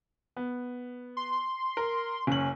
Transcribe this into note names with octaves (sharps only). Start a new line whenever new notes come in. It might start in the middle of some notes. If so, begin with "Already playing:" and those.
B3
C6
A#4
F#1 C#4 F#7